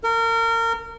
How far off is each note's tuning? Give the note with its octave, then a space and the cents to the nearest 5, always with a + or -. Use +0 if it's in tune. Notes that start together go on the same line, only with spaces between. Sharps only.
A#4 -30